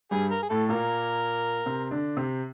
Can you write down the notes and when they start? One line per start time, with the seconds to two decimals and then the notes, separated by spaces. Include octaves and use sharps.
0.11 G2 G3 G#4
0.31 A#4
0.43 G#4
0.50 A2 A3 A4
0.69 A#2 A#3 A#4
1.66 C3 C4
1.91 D3 D4
2.17 C3 C4